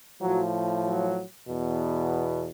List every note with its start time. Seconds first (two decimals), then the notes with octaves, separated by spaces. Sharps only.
0.21 A2 F3 F#3
0.84 F#3
1.47 E2 B2